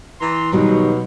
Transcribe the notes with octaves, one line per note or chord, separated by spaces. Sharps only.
E3 A#5 C6
B2 D#3 F#3 G3